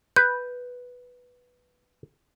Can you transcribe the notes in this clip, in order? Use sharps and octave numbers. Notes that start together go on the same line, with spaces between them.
B4 G6